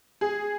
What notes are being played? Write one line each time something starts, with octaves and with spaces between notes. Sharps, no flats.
G#4